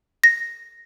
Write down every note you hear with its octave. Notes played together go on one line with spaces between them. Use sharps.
A#6